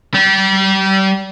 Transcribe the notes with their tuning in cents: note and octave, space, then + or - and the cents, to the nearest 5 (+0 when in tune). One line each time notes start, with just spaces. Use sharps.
G3 -30